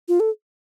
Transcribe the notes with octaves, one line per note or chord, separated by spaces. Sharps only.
F4
A4